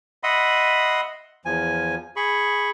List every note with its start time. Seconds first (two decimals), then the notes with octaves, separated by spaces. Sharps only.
0.23 D#5 E5 F#5 B5 C6 D#6
1.45 E2 F3 G#5
2.16 G#4 B5 C#6